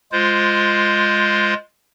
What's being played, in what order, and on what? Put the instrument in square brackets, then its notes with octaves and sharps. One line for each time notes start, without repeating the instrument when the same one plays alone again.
[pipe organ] G#3 F4 C5